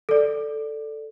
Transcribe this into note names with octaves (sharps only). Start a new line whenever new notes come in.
A4 D5